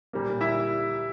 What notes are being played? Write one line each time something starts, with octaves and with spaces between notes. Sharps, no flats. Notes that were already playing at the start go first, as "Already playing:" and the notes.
A#2 G3 A#3
E4 E5